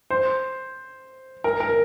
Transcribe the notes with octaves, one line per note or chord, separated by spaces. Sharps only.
C5
A#4
A#4